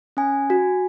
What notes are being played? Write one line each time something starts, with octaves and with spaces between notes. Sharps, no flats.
C#4 G#5
F#4